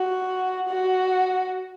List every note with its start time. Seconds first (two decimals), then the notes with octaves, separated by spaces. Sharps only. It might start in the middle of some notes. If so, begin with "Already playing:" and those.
Already playing: F#4
0.69 F#4